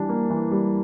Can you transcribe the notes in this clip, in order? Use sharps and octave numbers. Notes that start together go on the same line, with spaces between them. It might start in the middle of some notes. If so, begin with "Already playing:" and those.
Already playing: E3 G3 D4
A#3
E3
G3